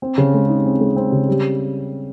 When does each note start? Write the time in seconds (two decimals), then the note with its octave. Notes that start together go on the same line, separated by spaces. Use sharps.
0.02 C4
0.18 C#3
0.34 G#3
0.49 D#4
0.65 C4
0.81 G#3
0.96 C4
1.12 C#3
1.29 G3